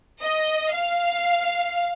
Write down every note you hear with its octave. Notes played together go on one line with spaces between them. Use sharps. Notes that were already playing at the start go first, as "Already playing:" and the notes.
D#5
F5